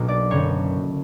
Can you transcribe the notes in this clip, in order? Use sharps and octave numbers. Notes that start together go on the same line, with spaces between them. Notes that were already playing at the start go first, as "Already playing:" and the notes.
Already playing: B1 B2 F#3 A#3 D4
D5
F#1 F#2 D3 C#5